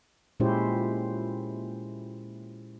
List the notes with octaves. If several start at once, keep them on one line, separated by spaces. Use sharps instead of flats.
A#2 G#3 C#4 E4 G4 C5